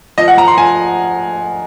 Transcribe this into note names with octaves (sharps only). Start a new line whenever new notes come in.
F3 D#5
F#5
F3 A#5
C6
F3 G#5